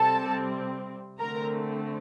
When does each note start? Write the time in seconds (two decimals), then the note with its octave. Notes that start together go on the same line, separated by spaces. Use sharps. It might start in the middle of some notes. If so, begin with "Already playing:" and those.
Already playing: C3 G3 C4 A4 A5
1.19 D3 A3 C4 A#4 A#5